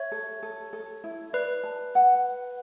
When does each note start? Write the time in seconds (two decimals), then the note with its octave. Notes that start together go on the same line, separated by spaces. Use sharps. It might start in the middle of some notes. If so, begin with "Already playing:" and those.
Already playing: C#5 E5
0.12 A4
0.43 A4
0.73 A4
1.04 E4
1.33 B4 D5
1.64 A5
1.95 F#5